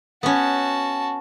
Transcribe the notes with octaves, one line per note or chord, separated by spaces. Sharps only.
B3 C#4 F#4 A5